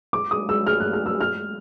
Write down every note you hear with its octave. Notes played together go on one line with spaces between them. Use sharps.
D6
D#6
E6
F6
F#6
F6
E6
F6